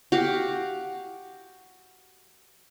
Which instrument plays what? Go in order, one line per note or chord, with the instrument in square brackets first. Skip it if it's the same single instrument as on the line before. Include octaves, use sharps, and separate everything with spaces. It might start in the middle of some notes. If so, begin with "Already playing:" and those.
[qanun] F#4 G4 F5